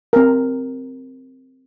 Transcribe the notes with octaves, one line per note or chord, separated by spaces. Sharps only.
C4 A#4